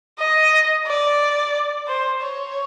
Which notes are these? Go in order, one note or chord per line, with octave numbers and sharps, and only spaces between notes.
D#5
D5
C5
C#5